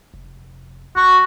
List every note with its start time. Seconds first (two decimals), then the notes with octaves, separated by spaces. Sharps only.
0.14 F1
0.96 G1 F#4 C#6